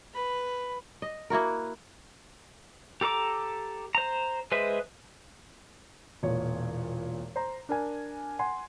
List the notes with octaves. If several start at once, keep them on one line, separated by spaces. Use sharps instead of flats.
B4 B5
D#5
A#3 E4 F#4 A#4
G4 A4 A#5 D6
C5 A#5
G#3 G#4 B4 C5 E5
E1 A#2 C#5
C5 A#5
D4 A#4 G#5
F#5 G#5 C6